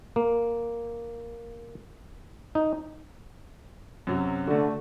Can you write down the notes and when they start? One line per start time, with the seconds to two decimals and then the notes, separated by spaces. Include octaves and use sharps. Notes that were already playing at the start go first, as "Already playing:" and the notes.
0.16 A#3
2.55 D#4
4.07 F#2 C3 F#3
4.48 D3 A3 F#4